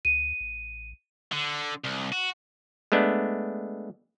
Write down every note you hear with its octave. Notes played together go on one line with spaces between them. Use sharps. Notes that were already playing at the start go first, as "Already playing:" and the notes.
D2 D#7
A1
D3
C2
F#4
G#3 A3 B3 D4